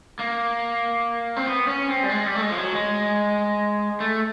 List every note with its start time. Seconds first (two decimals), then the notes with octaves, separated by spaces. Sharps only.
0.19 A#3
1.36 C4
1.46 B3
1.67 C#4
1.88 C4
2.03 G3
2.10 G#3
2.26 G3
2.35 A3
2.41 G#3
2.50 F3
2.58 F#3
2.73 G#3
4.00 A3